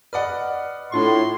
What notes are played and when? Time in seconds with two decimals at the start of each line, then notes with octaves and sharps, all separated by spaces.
0.13 B4 D5 D#5 F#5 D#6 F6
0.92 A2 D4 F4 C6 C#6